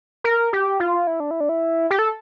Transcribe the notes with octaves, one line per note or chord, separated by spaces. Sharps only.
A#4
G4
F4
E4
D4
E4
D4
E4
G4
A4